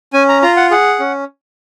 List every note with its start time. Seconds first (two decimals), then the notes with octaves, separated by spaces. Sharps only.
0.13 C#4 G#5
0.29 A#5
0.42 F4 A#5
0.56 F#5
0.71 G#4 F#5
1.00 C#4